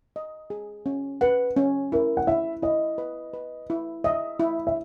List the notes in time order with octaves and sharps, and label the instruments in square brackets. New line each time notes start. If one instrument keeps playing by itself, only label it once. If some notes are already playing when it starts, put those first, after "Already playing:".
[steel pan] D#5
G#4
C#4
[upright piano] B4 [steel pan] F#5
[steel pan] C#4
[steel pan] E4 [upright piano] A#4
[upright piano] F#5
[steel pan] E4 [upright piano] E5
[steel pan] E4 [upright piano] D#5
[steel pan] B4
B4
E4
[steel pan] D#5 [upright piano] E5
[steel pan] E4
[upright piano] E5